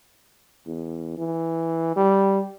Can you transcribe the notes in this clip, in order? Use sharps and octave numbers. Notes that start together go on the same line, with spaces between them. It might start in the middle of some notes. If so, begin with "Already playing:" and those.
E2
E3
G3